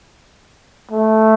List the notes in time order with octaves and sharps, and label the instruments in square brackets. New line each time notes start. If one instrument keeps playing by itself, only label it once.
[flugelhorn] A3